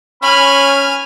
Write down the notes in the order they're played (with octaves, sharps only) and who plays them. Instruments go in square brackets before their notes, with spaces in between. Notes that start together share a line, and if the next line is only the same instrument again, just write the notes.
[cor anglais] C#4 [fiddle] G#5 F6 [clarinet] B5